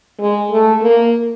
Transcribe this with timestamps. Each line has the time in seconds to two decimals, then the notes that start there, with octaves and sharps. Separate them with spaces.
0.20 G#3
0.51 A3
0.83 A#3